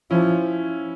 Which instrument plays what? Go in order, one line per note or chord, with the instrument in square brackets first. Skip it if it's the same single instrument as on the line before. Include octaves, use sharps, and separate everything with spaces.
[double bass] F3 [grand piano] C#4 E4